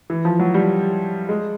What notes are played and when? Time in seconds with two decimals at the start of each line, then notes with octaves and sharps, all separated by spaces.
0.10 E3
0.25 F3
0.39 F#3
0.54 G3
1.29 G#3